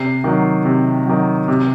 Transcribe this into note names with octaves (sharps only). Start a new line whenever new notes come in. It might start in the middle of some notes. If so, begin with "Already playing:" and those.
Already playing: C3 C7
D#3 F#3
C3
D#3 F#3
C3